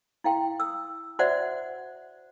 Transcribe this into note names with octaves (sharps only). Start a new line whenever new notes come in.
E4 F5 G5 C6
D#6 E6
F#4 C5 D5 E5 F#5